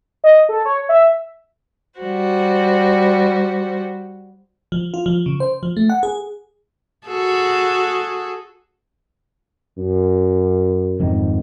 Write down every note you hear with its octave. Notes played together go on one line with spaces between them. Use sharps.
D#5
A4
C#5
E5
G3 F#4 C5
F3
F4
F3
C#3
C5
F3
A3
F#5
G#4
F#4 G#4 A4
F#2
F2 G#2 D#3